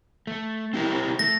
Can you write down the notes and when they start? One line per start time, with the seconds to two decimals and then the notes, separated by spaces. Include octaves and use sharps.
0.27 A3
0.74 C4 E4 G4 A#4
1.19 A3 A#6